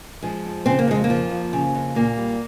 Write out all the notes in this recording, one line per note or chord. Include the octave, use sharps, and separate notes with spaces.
F3 G#3
F2
C#3 C4
A#3
F2 G#3
A#3
F3
F2
C#3
F2
A#2 A#3
G3